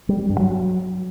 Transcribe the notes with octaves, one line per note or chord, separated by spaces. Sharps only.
G3
G3
G2
F#3